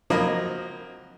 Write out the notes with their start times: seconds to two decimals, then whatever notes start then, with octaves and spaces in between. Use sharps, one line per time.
0.10 F3 F#3 A#3 C4 D#5 B5